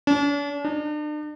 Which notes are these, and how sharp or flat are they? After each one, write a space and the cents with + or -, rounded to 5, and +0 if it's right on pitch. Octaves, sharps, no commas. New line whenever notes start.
D4 -45
D4 +40